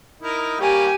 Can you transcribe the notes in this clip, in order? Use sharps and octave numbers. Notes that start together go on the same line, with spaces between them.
D#4 E4 A#4
G3 A#3 G4 C#5 G#5